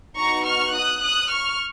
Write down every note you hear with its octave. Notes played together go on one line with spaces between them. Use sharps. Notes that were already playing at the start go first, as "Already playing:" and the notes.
B3 D#4 F#4 A#5 C#6
C#6 F6
D#6 F#6
D#6 F#6
C#6 F6